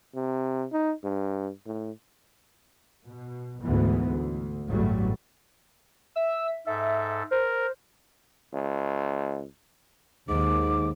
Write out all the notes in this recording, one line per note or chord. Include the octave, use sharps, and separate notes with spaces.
C3
D#4
G2
A2
B2
D2 G#2 E3 B3
D2
A1 E2 G2 F#3 G3 A3
E5 E6
G#2 A4 E5
A#4 C5
C#2
D#2 G#2 D6